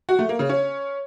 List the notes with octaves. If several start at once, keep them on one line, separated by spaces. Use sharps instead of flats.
F#4
A3
A#3
C#3
C#4